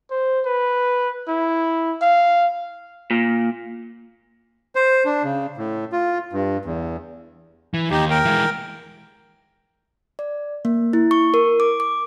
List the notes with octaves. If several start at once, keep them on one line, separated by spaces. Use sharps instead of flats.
C5
B4
E4
F5
A#2
C5
D4
C#3
A2
F4
G2
E2
E3
D#2 D#4 G4
A#4 G5
E3 G#3
D5
A#3
E4
C#6
A#4
D6
D6